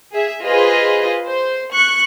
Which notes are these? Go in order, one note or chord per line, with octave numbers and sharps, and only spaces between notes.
G#4 E5
F4 G#4 B4 C5 D#5
C5
C#6 F#6 C#7